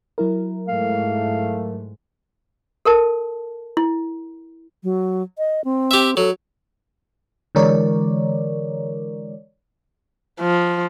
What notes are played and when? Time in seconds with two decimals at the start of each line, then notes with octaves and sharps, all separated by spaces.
0.18 F#3 E4 A#4
0.68 G#2 A3 F5
2.85 A4 A#4 A5
3.77 E4
4.83 F#3
5.38 D#5
5.65 C4
5.91 G4 E5
6.17 F#3 A4
7.55 D3 E3 G#3 A#4 C#5 D5
10.40 F3